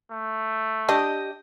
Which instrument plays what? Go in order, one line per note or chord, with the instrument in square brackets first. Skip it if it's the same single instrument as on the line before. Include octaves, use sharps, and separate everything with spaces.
[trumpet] A3
[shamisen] D4 [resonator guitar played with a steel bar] G4 D#5